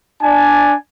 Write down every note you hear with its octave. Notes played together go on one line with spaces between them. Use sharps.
D4 D5 G#5 A5